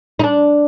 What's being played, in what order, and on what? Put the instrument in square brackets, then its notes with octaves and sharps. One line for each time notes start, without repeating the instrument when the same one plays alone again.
[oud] D#4
D4